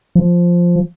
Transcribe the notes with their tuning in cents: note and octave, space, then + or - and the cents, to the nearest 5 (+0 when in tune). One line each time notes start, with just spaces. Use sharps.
F3 +0